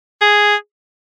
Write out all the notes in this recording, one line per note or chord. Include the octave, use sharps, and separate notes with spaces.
G#4